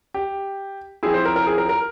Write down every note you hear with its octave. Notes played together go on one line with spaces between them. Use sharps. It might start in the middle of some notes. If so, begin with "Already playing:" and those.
G4
F3 C4 E4 G#4
C5
A#4
A#4
G#4
A#4
A#4